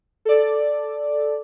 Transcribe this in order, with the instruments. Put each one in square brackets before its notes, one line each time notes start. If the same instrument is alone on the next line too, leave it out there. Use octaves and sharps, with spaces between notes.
[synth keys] A4 D5